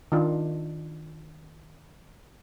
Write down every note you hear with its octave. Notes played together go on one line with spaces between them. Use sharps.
D#3 D4 F4